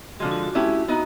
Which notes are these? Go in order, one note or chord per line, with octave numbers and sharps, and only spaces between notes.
D3 F3 G#3 F#4
F4
F#4
A3 C#4 E4 G4
B3 D#4 F#4